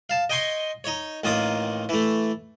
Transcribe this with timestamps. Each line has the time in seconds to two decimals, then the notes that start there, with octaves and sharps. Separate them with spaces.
0.10 F5 A5
0.30 D#5 G5 G#5 C6 C#6
0.84 D#4 C#5
1.24 A1 D#3 A#3 F4 D#6
1.89 E3 A3